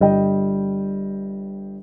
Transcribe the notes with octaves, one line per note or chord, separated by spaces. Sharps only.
G1 G3 D#5 G5